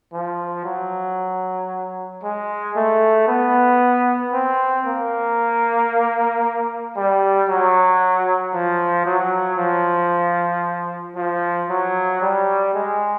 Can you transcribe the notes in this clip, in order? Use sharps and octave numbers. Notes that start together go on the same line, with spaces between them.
F3
F#3
G#3
A3
B3
C4
A#3
G3
F#3
F3
F#3
F3
F3
F#3
G3
G#3